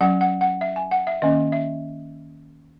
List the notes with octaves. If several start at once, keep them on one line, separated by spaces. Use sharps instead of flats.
F#3 C#4 F#5
F#5
F#5
E5
G#5
F#5
E5
D#3 A#3 C#4 D#5
E5